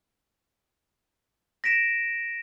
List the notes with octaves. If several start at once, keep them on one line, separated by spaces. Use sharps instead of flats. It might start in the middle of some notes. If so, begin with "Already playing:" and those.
A#6 B6 D7 E7